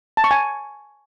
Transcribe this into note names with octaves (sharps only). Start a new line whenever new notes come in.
A5
C#6
G#5